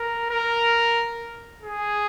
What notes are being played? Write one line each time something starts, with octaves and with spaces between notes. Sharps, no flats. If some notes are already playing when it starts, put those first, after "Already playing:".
Already playing: A#4
A#4
G#4